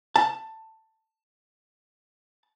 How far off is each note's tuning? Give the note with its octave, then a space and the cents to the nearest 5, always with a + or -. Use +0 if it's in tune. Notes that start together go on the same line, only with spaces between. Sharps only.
A5 +15